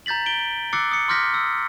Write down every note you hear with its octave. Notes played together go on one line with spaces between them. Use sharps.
A#5 G6 A6 B6 F#7
D7 G7
D6 E6 F#6 A6 C7 C#7
D#6 C#7
C6 D6 F6 G6 A#6 B6
E6